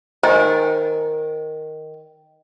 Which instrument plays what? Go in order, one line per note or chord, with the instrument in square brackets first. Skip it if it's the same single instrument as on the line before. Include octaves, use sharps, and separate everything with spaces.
[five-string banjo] D#3 [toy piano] C5 D#5 G#5